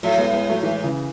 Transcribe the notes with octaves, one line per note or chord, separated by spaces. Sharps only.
A2 F#3 A3
G#3 B3
G#3 B3
F#3 A3
E3 G#3
C#3 E3